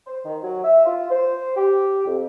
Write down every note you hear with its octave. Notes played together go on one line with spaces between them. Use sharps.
C5
D#3
F#3
E5
F4
C5
G4
F2